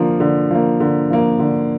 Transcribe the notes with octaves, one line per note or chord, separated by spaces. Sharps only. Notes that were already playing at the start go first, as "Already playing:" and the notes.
Already playing: D3 F3 A#3
D3
F3 A#3
D3
F3 A#3
D3